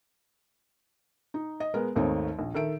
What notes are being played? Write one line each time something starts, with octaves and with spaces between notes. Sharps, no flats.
D#4
D#5
G#3 B3 A#4
G#1 D#2 A3 C4 D#4 C#5
A#1
D#3 A4 E5 D7